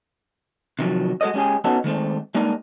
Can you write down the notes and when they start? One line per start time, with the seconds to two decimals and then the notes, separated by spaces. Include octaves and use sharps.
0.79 C3 D#3 F3 F#3
1.21 G#3 F#4 A4 C#5 D#5
1.34 G#3 B3 C#4 G4 G#4
1.64 B3 C#4 D#4 F#4 A4
1.84 D#3 G#3 A3 C4
2.35 G3 G#3 A#3 D4 D#4 A#4